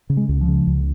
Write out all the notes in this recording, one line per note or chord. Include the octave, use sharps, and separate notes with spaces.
C#3
G#3
C#2
F3
C#3
C#2